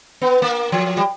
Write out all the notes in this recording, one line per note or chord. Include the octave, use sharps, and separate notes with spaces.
B3
A#3
F3
G3